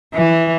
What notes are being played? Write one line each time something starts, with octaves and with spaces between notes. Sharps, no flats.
E3